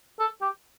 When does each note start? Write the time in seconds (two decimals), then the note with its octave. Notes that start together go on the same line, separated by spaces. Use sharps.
0.19 A4
0.41 G4